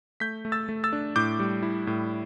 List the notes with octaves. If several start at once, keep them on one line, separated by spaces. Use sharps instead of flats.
A3 G6 B6
A3
E6 A6
A3
E6 A6
D4
A2 D6 G6
G3
E4
A2